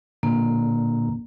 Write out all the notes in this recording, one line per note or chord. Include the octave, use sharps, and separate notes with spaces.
A#2 D3 A#3